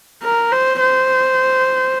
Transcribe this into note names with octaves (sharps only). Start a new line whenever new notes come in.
A#4
C5
C5